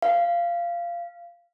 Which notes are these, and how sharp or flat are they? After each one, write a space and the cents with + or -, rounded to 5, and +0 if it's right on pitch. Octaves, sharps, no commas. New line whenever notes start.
F5 -15